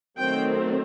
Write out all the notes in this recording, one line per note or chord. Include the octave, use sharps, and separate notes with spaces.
D#3 F#3 A3 C4 G5